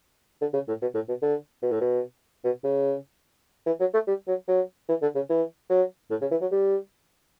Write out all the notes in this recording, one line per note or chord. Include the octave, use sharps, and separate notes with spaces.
D3
C#3
A2
B2
A2
B2
D3
B2
A2
B2
B2
C#3
E3
F#3
A3
G3
F#3
F#3
E3
D3
C#3
E3
F#3
A2
C#3
E3
F#3
G3